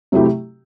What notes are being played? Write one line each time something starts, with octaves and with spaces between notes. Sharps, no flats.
C3 F#3 A3 E4 G4